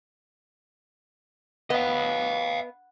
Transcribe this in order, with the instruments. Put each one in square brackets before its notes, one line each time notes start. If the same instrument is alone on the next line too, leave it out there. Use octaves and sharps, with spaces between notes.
[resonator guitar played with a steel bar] B3 [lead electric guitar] D#5 F5